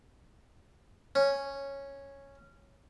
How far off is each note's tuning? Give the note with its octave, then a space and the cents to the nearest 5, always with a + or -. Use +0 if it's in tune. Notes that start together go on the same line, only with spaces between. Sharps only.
C#4 -5